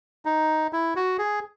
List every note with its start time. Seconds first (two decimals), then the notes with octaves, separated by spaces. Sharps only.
0.25 D#4
0.73 E4
0.96 F#4
1.19 G#4